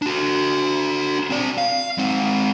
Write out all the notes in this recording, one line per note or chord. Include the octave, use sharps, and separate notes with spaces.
D4 F#4
C4 D5
F5
G#3 C4